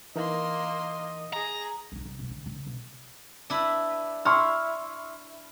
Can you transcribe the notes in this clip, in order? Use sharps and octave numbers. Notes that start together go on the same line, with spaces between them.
E3 A#3 D#4 A#4 D#5 C6
G#4 A#5
B1 F4
C2
B2 F3
D3
A2 C#3
B1
D4 E4 B4
E4 C6 C#6 F6